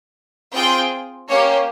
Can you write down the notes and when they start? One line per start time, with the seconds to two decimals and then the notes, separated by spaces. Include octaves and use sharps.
0.53 C4 F4 G#4 G5
1.28 A#3 C#4 G4 C#5